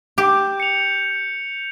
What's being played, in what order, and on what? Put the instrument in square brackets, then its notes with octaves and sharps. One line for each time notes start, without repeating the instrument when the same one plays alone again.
[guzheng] G4 [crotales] G6
[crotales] C#7 F7